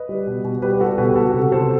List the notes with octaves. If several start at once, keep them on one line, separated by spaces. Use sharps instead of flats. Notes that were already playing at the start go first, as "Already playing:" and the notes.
Already playing: B4 D#5
G3
B2
B2
G3 G4 B4
G3 F#4 A4
B2 G4 B4
B2 F#4 A4
C3
C3 A4 C5